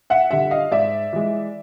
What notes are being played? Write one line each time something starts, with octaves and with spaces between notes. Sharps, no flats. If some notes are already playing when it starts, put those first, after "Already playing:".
E5 F#5
D3 G3 E5 F#5
D#5 F5
G#2 D5 E5
E3 G#3